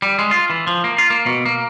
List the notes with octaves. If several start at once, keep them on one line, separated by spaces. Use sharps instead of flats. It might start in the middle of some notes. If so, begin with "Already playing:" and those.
G3
G#3
F4
E3
F3
A#3
F4
A#3
B2
A#3